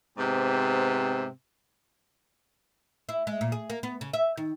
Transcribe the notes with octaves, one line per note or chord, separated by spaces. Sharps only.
G#2 C3 B3 G4
E4
G#3
A#2
G#4
A#3
B3
C#3
E5
D#3